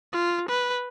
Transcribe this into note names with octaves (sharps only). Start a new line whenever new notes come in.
F4
B4